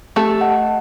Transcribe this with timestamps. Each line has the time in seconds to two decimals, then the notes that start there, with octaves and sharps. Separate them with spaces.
0.16 A3 G4 A4
0.41 D#5 F#5 A5